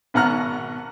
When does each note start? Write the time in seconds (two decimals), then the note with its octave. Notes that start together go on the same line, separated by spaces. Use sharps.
0.14 G#1 B2 F#5 A#5 F6